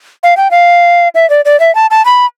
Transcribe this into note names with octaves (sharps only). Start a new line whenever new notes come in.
F5
G5
F5
E5
D5
D5
E5
A5
A5
B5